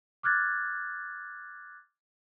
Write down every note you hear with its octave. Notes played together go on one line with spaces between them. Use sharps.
D6 F6 F#6 G#6 A6